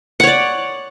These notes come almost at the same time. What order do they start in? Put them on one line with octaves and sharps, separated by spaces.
F#5 C#5 D5